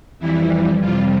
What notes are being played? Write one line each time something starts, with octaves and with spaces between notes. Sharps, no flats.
F2 E3 G3 E4
F2 C3 G3 F4